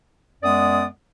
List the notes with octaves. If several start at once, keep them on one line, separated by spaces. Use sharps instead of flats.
F#2 G#3 B3 D5 D#6